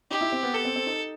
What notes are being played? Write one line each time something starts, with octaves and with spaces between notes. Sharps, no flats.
D#4 G4
E4
C4
B3
B3 A4
C4
C4
D#4